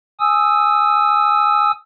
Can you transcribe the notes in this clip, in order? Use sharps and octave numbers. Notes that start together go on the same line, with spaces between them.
G#5 D#6 E6